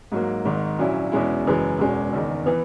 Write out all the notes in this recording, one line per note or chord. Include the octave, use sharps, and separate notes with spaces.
G#2 F#3 A#3
G#1 G#2 D#3
A#1 A#2 F#3 C#4 E4
E2 B2 G#3 C#4 E4
F#1 F#2 E3 G#3
E1 E2 B2 G#3 C#4
F#1 E2 D#3
E3 B3